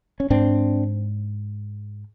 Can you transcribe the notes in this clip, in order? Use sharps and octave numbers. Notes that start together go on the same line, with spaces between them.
C#4
G#2 C4 D4